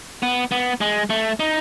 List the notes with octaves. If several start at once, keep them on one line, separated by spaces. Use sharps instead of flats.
B3
B3
G#3
A3
D#4